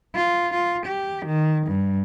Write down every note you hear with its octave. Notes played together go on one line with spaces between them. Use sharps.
F4
F4
G4
D#3
G2